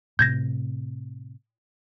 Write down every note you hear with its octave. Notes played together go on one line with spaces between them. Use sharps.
A2 C3 G6 G#6 A#6